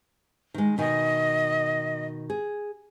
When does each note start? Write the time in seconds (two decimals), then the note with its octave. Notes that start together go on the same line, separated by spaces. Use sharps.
0.54 D#3 G#3
0.78 B2 D#3 D#5 G#5
2.30 G#4